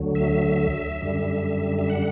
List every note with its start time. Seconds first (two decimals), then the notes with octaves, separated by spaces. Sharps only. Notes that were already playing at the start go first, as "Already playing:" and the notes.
Already playing: D2 D3 F#3
0.15 E5
1.02 F#2 D3 G3
1.79 E5
1.90 F#5